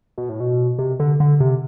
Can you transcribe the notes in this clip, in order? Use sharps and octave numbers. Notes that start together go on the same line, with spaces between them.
B2
A2
B2
C3
D3
D3
C3